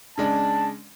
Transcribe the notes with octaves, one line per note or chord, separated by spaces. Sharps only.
C#3 G#3 D4 A5